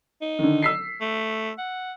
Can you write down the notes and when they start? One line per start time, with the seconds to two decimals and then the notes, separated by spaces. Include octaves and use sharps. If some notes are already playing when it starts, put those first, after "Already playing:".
0.22 D#4
0.39 D3 D#3
0.63 E6 B6 C7
1.01 A3
1.59 F#5